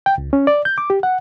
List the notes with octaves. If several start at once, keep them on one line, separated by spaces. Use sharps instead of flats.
G5
C#2
C#4
D5
G6
D6
G4
F#5